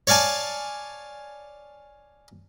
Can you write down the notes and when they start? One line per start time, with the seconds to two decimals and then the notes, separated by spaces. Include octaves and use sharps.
0.07 C#5 D5 F5 G#5 A5